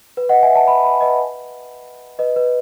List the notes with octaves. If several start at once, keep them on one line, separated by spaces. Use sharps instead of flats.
B4
D#5 F#5
E5 G#5
F#5 A5
G#5 B5
G#5 B5
B4 D#5
B4 D#5
B4